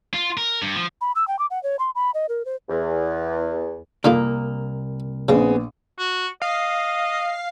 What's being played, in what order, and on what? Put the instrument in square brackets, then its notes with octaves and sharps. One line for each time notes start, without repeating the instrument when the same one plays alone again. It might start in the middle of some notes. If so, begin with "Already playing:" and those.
[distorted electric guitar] F4
A#4
G2
F3
[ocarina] B5
E6
G5
D6
F#5
C#5
C6
B5
D#5
A#4
C5
[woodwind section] E2
[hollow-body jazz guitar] C2 A#3 [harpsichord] D3 D#4 F4
[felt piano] A#1 [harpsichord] C#3 [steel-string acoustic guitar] B3 C4 G#4
[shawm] F#4
[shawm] D#5 [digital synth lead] F5